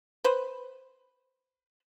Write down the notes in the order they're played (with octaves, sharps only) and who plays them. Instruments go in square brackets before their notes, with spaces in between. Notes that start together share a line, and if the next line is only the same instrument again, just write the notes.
[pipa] B4 C5